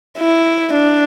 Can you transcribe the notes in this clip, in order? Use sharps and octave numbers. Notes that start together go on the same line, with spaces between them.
E4
D4